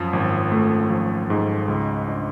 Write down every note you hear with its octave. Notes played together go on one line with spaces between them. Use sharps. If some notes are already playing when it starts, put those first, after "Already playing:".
Already playing: F#2 F3
G#1
A3
F3
G#2
C#2
D4